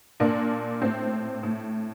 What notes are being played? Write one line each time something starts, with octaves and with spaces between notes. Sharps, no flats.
A#2 A#3 D4
A2 C4
A2